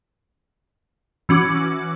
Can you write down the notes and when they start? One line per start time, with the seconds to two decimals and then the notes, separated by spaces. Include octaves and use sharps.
1.29 E3 C#4 F#4 D6